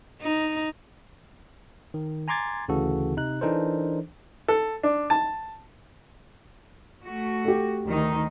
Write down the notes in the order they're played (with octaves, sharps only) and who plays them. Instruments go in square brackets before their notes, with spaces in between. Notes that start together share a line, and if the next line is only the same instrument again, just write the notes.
[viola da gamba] D#4
[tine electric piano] D#3
G#5 A#5 C6 D6 G#6 A6
D2 C#3 E3 F#4 A4
C3 D#4 F#6
E3 D4 D#4 A4 A#4 C5
[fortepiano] A4
D4
A5
[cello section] A3 F#4
[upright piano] G4 A4
[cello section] D2 D#3 D#4